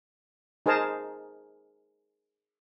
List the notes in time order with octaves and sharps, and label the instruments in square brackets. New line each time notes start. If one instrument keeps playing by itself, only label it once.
[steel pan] D#4 G#4 A#4 C5 A5 A#5